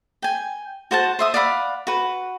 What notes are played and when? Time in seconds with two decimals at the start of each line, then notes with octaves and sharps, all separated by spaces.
0.22 G5 G#5
0.91 F#4 C5 F#5 A5
1.19 C5 E5 D#6
1.34 D5 F5 F#5 B5
1.87 F#4 B4